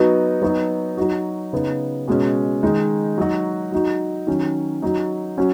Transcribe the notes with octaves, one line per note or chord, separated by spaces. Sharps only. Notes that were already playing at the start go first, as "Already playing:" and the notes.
Already playing: F#3 B3 D#4 F#4
F#3 B3 D#4 F#4
F#3 D#4 F#4
C#3 B3 D#4
B2 G#3 C#4
D#3 G#3 D#4
F#3 D#4 F#4
F#3 D#4 F#4
D#3 F#3 C#4
F#3 D#4 F#4
F#3 C#4 F#4